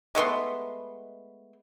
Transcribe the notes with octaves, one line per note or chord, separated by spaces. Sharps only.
G#3 A3 B3 C6